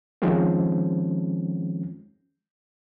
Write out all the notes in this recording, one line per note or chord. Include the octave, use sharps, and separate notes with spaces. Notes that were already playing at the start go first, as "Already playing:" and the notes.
D#3 F3 G#3 C4 C#4